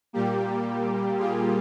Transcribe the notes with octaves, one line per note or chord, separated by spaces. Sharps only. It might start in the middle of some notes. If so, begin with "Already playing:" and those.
A#2 G3 A#3 G4
F4 G#4